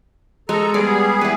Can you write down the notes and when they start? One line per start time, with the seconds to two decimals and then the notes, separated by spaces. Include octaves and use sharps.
0.49 G#3 A4 A#5
0.74 G3 B3 G#4 D5
1.21 E4 B4